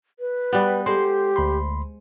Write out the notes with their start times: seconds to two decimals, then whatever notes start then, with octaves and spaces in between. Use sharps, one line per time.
0.19 B4
0.53 G3 B3
0.86 G#3 G4 A4 C5 C6
1.36 D2 B5 C6